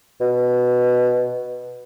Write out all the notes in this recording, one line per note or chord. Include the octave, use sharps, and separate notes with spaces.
B2